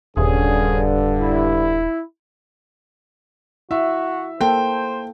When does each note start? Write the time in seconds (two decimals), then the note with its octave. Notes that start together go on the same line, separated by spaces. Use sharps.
0.17 D#1 G2 D3 C#4 G#4
1.21 E4
3.71 E4 F#4 E5
4.41 A#3 A4 C5 G5